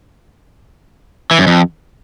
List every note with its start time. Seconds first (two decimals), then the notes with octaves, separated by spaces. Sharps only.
1.31 E3
1.39 F#2
1.47 F2